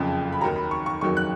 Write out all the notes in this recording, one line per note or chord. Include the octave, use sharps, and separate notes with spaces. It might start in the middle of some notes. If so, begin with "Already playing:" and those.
Already playing: F#1 F2 C#3 F3
B5
D#2 D#3 F#3 A#5
B5
C#6
C#6
F#1 F2 D#3 F#3 C#6
F#6